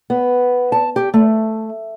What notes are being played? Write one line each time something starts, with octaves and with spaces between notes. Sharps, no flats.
B3
A5
G4
A3